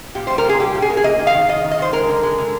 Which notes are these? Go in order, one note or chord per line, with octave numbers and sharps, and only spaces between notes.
A#2 G4
G3 C5
A#4
A#2
G#4
G3 G4
A#2
G#4
A#2 A#4
G#4
A#3 D#5
D#3
F5
D#3
D#3 D#5
D#3
D#5
D#3 C5
G#3 A#4
D3
G#3
D3